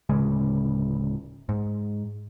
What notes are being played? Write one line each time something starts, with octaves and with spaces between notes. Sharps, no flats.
D1 C#3 G#3
G#2